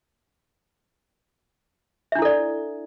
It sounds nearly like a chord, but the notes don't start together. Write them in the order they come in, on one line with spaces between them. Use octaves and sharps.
E5 D4 E4 A4 D5